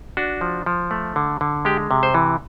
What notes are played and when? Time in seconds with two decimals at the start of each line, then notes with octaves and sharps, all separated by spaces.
0.17 D4 F#4
0.41 F3
0.66 F3
0.91 A3
1.16 D3
1.41 D3
1.65 G#3 G4
1.91 C3
2.03 C5
2.14 E3